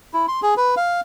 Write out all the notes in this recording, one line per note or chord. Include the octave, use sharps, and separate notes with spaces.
E4
C6
G#4
B4
F5